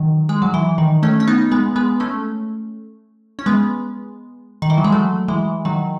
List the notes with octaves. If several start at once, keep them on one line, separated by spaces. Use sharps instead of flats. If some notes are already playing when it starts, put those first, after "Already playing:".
Already playing: D#3 F#3
G#3
F#3
E3
D#3
A3 C#4
C#4
B3 D#4
G#3 B3
G#3 B3
A3 C#4
C#4
G#3 B3
D#3
E3
F#3
G#3
F#3 A3
E3 G#3
D#3 F#3